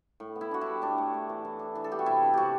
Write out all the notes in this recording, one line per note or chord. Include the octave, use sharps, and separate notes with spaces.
A2
B3
E4
D4 F#4
E4
G3
A2 D4
A3
A2
E3
E3
D4
E3
A4
B3 G4
F#4
C3 E4
D4
C3 F#4 G4